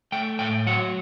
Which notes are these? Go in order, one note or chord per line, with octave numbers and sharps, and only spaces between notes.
A3 G5
A2 G5
F#3 F#5